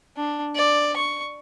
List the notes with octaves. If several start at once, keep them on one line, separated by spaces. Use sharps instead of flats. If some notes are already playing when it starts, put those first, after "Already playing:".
D4
D5
C#6